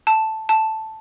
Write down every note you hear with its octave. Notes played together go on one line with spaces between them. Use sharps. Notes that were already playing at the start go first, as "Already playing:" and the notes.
A5
A5